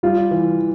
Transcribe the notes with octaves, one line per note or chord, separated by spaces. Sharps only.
G3 F4
E3